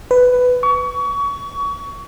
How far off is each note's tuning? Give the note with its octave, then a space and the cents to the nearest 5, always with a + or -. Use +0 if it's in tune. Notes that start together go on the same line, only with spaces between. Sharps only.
B4 +10
C#6 +30